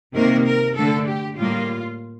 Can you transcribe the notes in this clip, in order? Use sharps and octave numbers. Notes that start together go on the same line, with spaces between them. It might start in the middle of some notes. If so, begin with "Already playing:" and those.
C3 D#3 A#3 A#4
A#4
D3 A3 A4
G4
A2 G3 A#3 F4